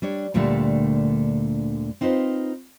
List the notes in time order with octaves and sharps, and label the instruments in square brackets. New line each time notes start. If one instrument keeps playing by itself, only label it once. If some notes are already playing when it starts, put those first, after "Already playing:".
[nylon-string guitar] G3 D4 C#5
D2 A#2 D3 G3 A3 A#4
C4 D#4 F4 B4 C5